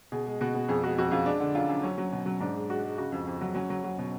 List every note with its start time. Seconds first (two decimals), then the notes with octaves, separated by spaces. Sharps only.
0.12 B2 G#4
0.27 G#3
0.41 B2 F#4
0.54 B2
0.69 F2 G#4
0.83 G#3 F#4
0.98 F2 F#4
1.11 F2 F4
1.26 G#3 D4
1.40 D3
1.55 F#2 F4
1.69 F#2
1.83 F#3 C#4
1.98 F#3
2.12 B2
2.26 F#3
2.40 G#2 D4
2.55 G#3
2.70 G#3 F#4
2.84 G#3
2.97 C#3 F#4
3.12 F2
3.27 F2
3.41 F#3
3.55 F#3 C#4
3.70 F#3
3.84 F#3
3.99 B2